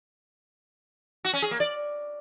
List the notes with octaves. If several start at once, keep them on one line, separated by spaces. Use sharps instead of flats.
F#4
C#4
G#4
A#3
D5